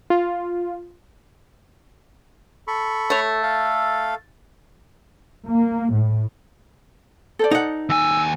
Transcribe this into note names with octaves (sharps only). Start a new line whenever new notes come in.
F4
A4 B5 C#6
A3 C#5
A4 F5
A#3
A2
A4 C5 D5
D#4 F#5
D#2 G#5 E6